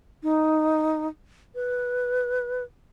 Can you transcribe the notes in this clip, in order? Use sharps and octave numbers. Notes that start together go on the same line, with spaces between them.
D#4
B4